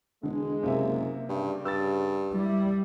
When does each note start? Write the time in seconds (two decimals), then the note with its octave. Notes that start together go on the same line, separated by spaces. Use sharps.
0.23 E1 D3 G#3
0.63 F#1 C3 A#3 E5
1.29 G2 C#3 G3
1.65 G2 E6 A6
2.33 G3 E4